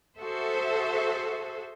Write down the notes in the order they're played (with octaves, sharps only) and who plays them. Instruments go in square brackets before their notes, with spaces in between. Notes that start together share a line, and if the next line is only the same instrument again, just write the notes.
[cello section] F#4 G#4 A4 C5 E5